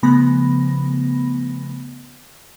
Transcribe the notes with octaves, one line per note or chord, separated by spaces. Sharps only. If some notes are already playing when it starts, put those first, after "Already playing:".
C#3 F3 A3 B3 B5 A#6